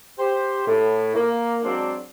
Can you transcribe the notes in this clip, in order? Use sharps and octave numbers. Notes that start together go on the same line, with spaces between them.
G4 C5
A2
A#3
F#3 G#3 C4 D4